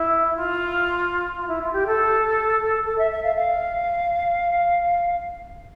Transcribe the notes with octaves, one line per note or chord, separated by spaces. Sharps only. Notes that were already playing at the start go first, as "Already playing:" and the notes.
Already playing: E4
F4
F4
E4
F4
G4
A4
A4
E5
E5
F5
F5